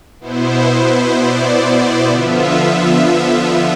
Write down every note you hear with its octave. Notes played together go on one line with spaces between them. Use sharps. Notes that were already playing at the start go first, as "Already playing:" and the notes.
B2 B3 E4 C5
C5
D5
D5
D3 F3 B3 F4 E5
E5